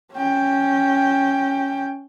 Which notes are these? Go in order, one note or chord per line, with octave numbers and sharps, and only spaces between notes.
C#4 G5